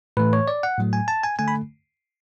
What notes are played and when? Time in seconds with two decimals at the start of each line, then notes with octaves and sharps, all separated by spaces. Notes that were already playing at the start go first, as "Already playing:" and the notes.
0.17 A2 E3 A3 B4
0.33 C#5
0.48 D5
0.63 F#5
0.78 A2 F#3 A3
0.93 G#5
1.08 A5
1.23 G#5
1.39 D3 A3 G#5
1.48 B5